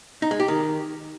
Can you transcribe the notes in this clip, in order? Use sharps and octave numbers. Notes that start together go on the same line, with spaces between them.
D#4
G#3
G4
D#3